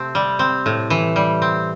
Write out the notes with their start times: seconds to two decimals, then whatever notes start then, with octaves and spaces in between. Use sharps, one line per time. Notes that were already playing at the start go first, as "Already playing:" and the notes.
Already playing: C3 A3 C4
0.15 G3
0.39 C4
0.66 A2
0.90 E3
1.16 G3
1.42 C4